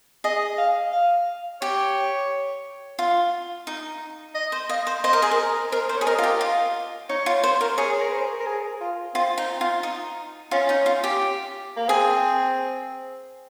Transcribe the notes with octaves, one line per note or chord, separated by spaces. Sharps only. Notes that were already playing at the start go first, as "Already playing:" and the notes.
G#4 D#5
F5
F5
G4 C#5
F4
D#4
D#5
C5
D#5 F5
C5
C5 D#5
A#4
G#4
A#4
A#4 C5
C5
G#4 C#5
A#4 D#5
F4
G4
F4
D#4 C#5
F4
C5
A#4
G#4 C#5
A#4
C5
A#4
G#4
F4
C4 F4
D#4
F4
D#4
C#4 F4
D#4
F4
G4
A#3
C4 G#4